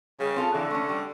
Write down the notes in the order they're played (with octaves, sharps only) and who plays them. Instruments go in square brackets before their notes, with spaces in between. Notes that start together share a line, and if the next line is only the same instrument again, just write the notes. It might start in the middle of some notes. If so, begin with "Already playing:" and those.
[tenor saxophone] C#3 [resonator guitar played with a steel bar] G3
[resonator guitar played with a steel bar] C4 F4 A4
[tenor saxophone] D3 [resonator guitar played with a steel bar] E3
[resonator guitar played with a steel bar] A3 C#4
G3